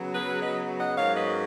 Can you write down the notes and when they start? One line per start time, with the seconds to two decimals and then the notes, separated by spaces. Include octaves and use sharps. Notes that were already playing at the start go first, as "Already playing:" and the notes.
Already playing: C#3 F#3 B3
0.14 G#4 B4
0.41 B4 D#5
0.79 D#5 F#5
0.97 G#2 F#3 A#3 C#4 C#5 F5
1.15 B4 D#5